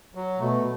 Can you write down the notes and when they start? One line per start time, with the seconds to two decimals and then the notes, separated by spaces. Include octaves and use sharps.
0.15 F#3
0.38 B2 A3